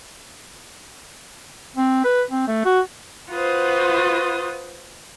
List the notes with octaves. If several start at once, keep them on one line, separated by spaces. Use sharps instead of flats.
C4
B4
C4
A3
F#4
F4 F#4 B4 C5 D#6